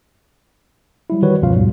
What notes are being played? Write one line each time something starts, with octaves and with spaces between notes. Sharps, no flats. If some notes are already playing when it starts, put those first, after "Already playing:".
F#3 G3 E4
D#3 E3 G3 F#4 B4 C#5
C#2 F#2 B2 F3 F4 F5
D#2 G#2 B2 G3